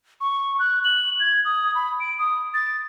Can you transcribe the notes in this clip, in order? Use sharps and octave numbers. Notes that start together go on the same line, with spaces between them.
C#6
F#6
F#7
G#6
D#6
B5
D7
D#6
A6